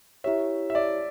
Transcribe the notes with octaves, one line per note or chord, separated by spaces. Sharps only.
E4 G4 C#5 E5
E5
D5